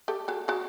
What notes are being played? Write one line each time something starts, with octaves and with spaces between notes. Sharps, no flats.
G4 A4
F#4 G#4
F#4 G#4